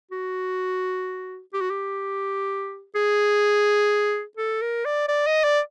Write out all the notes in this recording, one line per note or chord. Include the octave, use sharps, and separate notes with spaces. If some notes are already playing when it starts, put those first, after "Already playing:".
F#4
G4
F#4
G4
G#4
A4
A#4
D5
D5
D#5
D5